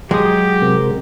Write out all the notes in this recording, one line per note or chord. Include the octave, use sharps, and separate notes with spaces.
F#3 G#3 G4 D#6
C3 C4 A#4